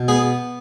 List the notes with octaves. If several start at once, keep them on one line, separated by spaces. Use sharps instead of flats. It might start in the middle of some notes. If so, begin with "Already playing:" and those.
Already playing: B2
B3 G#4